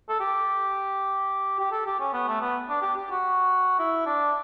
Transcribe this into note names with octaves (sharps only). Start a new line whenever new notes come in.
A4
G4
G4
A4
G4
C#4
B3
A3
B3
D4
G4
G4
F#4
E4
D4